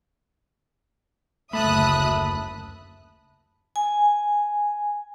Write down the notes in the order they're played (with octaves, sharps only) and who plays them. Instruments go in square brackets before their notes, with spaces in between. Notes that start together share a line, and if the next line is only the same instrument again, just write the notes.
[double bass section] F#1 D2 [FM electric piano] A3 [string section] E5 D#6 F#6 [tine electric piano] A5 B5
[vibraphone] G#5